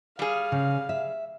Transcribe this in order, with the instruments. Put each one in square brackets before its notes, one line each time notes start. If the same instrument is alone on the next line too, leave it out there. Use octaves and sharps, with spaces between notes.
[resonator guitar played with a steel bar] G3 G#4 [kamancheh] F5
[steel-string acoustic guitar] C#3
E5